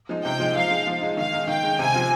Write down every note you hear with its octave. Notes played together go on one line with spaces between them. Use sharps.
F3 G#3 D#4
C3 G5
F3 G#3 D#4
F3 F5
G#3 D#4
F3
G#3 D#4
D#3 F5
G#3 D#4
D#3 G5
G#3 D#4
C3 G#5
F3 C4 F4